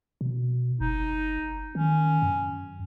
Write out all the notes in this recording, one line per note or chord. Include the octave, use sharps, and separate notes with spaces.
B2
F#1 D#4
D#3 C#4
F#2